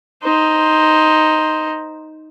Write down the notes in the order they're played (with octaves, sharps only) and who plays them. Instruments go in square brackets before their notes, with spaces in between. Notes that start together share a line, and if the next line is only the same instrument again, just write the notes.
[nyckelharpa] D#4 C5